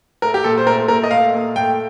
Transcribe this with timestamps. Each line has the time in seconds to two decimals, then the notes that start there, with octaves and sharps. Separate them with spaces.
0.22 A3 A#4
0.34 G4
0.44 A#2 A4
0.58 C5
0.66 A3 A#4
0.88 A#2 A#4
1.03 D#5
1.11 A3 F5
1.34 A#2
1.56 A3 G5